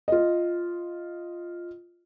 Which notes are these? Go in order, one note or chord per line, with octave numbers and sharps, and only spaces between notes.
F4 D#5